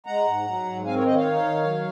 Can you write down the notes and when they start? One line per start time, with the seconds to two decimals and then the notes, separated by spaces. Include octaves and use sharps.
0.06 G#3 F#5 A#5
0.27 G#2
0.47 F#3
0.66 G#2
0.86 C4 F5 G#5
0.95 A#4 C#5
1.05 D#3 C5 D#5
1.15 C#5 F5
1.25 D#4
1.45 D#3
1.64 F#3